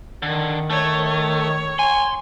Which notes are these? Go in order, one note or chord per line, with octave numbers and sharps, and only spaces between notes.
D3 D#3
A3 C#5
C#5
G#5 C6